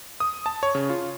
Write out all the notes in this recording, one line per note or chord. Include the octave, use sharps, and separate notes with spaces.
D#6
A5
C#5
C#3
F4